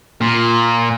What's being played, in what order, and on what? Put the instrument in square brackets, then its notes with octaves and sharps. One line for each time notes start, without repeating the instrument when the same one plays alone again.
[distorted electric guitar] A#2